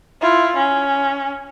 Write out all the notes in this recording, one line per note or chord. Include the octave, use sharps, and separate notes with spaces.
E4 F4
C#4